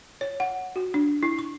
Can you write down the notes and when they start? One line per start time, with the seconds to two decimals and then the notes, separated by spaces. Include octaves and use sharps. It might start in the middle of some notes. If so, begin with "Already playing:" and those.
0.21 C#5
0.40 F#5
0.76 F#4
0.94 D4
1.23 E4
1.39 C#6